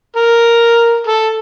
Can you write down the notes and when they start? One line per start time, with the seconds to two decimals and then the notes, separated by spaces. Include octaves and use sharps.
0.16 A#4
1.07 A4